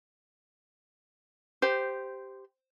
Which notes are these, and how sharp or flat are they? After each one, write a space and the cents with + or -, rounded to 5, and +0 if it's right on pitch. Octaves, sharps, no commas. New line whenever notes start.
G4 +0 C5 -10